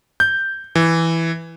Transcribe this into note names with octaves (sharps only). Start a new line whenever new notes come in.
G6
E3